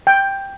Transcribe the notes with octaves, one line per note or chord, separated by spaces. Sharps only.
G5